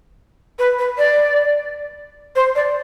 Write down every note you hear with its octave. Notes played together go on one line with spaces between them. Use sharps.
B4
B4
D5
C5
D5